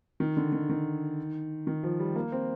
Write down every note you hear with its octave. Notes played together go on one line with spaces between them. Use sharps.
D#3
D3
D#3
D#3
D#3
F3
G3
A#3
C4